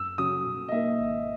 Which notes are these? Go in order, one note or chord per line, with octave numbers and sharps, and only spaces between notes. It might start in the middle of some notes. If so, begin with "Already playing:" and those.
Already playing: F#2 E6
C#3 F#3 C#4 F#4 D#6
B2
D#5
A#3 D#4 A#4 E5
G#1